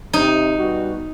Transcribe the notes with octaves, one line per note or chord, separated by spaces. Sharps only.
C3 D#4
B2 G3 F#4